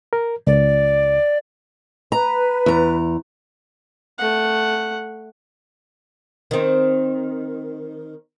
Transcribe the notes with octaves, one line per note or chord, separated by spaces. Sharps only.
A#4
C#2 D5
B4 A#5
E2 A#5
A3 F#5
D#3 C4